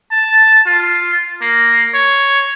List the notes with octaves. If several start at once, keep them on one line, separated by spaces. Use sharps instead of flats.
A5
F4
A#3
C#5